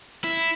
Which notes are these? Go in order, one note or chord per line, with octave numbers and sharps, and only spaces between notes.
E4